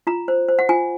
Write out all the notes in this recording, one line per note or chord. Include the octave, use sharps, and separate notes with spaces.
F4 A#5
C5
C5
F#5
F4 G#5